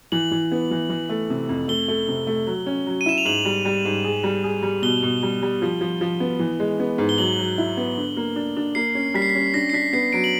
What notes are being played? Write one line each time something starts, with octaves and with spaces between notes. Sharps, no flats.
E3 F#7
E3
B3
E3
E3
A3
C3
F2
A3 G7
A3
C3
A3
F#3
C#4
F#3
D#7
E4 E7
F7
G#2 F#7
G3
G3
G#2
G#4
G3
G#4
G3
B2 G7
B2
G3
G3
F3
F3
F3
B3
E3
G#3
B3
G#2
G7
F#3 F#7
F#3
E4
B3
D3
A#3
D4
D4
A#3 C7
C#4
G3 B6
C7
B6
C#4
D4 A#6
C7
D4 B6
B3 C7
F#3 D7
F#7